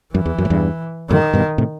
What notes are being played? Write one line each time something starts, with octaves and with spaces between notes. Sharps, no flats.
F#2 E3
E2
F#2
A2
E2 G2
F#2 A2 D#3
G2 B2
A2 C3